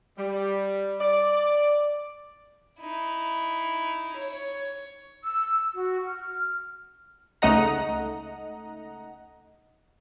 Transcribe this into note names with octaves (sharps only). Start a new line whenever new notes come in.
G3
D5
D#4 E4
C#5
E6
F#4
F6
C#2 A3 D#4 D#5 F#5 A#5